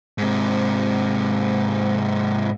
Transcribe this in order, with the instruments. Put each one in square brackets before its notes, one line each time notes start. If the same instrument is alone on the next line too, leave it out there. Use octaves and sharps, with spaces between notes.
[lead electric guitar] G#2 C3